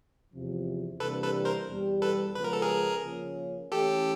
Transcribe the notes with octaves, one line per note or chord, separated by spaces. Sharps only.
E2 C3 F3
C3 E3 G3 A#3 D4 A4 B4
A4 B4
A#4 C5
E2 B2 G3
A4 B4
C#3 F3 G#3 B3 B4
A#4
A4
G#4 A#4
C#3 F3 A#3 C#4
E3 A3 C#4 E4 G4 A4